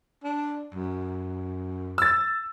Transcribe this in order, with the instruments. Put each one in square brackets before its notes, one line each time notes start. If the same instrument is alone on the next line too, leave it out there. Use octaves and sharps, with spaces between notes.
[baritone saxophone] D4
F#2
[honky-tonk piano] E6 A6